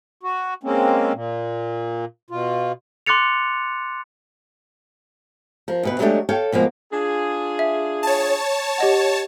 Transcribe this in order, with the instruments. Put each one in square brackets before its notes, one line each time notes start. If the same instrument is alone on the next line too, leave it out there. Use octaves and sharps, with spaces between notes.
[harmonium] F#4
G#3 A#3 C4 C#4
A#2
B2 F4
[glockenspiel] C6 D6 F#6 A6 C#7 F7
[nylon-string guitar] F3 A#4
D2 B2 B4
F#3 G#3 A3 C#4 D4 G4
A4 C#5 F5 G5
B2 F3 G#3 A#3
[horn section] D4 F4 G#4
[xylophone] E5
[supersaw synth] C#5 A5
[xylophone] G4 D#5 F#5